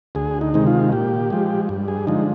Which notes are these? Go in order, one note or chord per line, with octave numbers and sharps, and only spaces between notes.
D2 G#4
D#4
C3 D#3 G#3
F4
A#2 G4
F3 G#3
G2
G#4
D3 F3 G#3 D#4